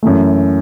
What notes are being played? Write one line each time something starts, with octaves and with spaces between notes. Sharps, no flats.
F#2 E3 A3